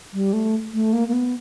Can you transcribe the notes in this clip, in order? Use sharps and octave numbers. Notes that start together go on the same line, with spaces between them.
G3
A3
A3
A#3
A#3
B3